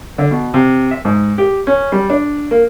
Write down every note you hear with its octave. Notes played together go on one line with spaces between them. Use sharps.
D3
B2
C3
E5
G#2
G4
C#4
G3
D4
A#3